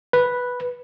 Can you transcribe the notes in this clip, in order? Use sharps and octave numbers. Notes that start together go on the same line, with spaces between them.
B4